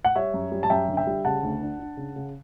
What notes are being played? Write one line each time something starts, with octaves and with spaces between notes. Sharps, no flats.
F#5
G3 C#5 E5
F#2
G3
A5
F#2 E5 G5
D3
E5 G5
G3
C#3 F#5 A5
D2
D4
D4
C#3
C#3